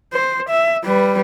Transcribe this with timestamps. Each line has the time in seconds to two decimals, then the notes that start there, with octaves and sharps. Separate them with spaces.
0.13 C5
0.49 E5
0.84 G3 B4